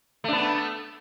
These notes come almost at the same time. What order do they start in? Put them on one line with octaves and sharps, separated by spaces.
A3 D4 B3